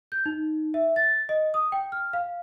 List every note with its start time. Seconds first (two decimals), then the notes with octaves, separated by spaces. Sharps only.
0.12 G6
0.26 D#4
0.74 E5
0.96 A6
1.29 D#5
1.54 D#6
1.72 G5
1.92 F6
2.13 F5